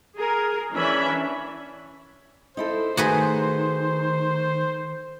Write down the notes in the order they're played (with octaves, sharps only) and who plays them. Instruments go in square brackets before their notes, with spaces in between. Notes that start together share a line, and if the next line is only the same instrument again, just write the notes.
[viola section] G#4 A#4
E3 C#4 D4 E5 B5
[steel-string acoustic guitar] D#4 E4 A4 [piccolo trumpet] C5
[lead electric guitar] D#3 [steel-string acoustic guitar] A3 [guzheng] F#4 G#4 B4